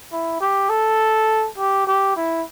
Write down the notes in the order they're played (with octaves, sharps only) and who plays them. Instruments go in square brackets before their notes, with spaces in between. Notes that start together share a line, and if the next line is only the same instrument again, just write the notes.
[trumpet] E4
G4
A4
G4
G4
E4